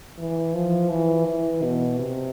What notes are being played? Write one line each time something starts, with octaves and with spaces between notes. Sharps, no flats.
E3
F3
E3
E3
B2
C3